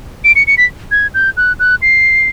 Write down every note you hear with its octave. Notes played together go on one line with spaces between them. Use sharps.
D7
C#7
C#7
B6
G#6
G6
F#6
F#6
C7